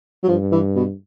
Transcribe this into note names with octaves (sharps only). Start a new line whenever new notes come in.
F#3
G2 F3
E3
B2